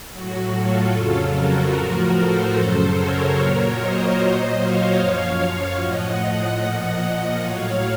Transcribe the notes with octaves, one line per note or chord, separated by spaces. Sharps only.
A2 F#3 F#4
F4 A4
F2 C#3 F#3
F#4 A#4
A2 F3
A4 C5
F#2 C#3 F#3
A#4 C#5
A#2 F#3
C5 D#5
A#2 F#3
C#5 F5
F#2 F3
A2 F3 D#5 F#5
A#2 F3 D#5 F#5
A2 F#3 C#5 F5